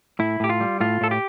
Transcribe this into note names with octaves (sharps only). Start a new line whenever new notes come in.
A2 E4
A2 G4
F4
G3
A2 F4
A2 A4
G4